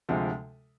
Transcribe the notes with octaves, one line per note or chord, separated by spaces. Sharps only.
D2 C3 F3 G#3